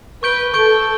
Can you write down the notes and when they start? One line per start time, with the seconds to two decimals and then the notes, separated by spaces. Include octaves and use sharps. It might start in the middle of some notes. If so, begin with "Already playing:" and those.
0.23 B4 C#6 G6 D7 G7
0.53 A4 C#6 G6 D7 G7